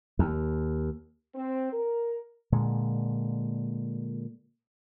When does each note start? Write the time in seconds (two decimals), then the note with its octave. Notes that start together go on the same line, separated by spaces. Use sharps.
0.19 D#2
1.34 C4
1.72 A#4
2.52 A#2 D3 G#3